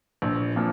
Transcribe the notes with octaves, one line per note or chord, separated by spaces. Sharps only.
A#1
A#2 F3